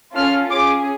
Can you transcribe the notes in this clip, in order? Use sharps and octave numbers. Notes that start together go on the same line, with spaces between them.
C#4 F4 A4 F6
C#4 G#4 D6